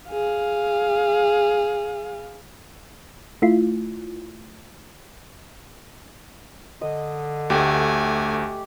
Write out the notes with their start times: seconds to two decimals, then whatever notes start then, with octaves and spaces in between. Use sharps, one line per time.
0.10 G#4 F5
3.42 A3 E4 F4
6.81 D3 D#5
7.50 D2 A3 G4 G#5